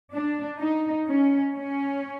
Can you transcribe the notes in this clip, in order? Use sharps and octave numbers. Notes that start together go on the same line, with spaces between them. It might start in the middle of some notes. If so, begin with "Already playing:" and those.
D4
D#4
C#4
C#4